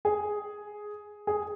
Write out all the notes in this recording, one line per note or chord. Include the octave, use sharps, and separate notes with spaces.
G#4
G#4